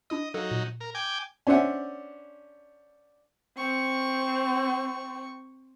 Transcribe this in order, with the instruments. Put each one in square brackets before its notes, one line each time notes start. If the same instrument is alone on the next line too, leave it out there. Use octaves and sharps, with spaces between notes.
[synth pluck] D4 E4 D#6 [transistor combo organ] D#5
[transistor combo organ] F#3 D#4 [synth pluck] A4 F5
[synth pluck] A#2
[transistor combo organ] A#4
G5 G#5 D6
[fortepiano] C#4 D4 C5 E5 F#5 G#5
[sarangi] C4 [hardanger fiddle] C#6